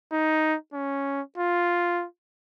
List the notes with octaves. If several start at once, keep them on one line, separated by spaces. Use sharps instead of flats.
D#4
C#4
F4